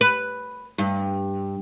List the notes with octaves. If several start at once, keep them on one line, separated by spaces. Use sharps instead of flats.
B4
G2